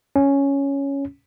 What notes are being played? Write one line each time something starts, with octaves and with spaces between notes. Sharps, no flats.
C#4